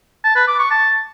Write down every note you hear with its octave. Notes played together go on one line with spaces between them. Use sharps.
A5
B4
D6
C#6
A5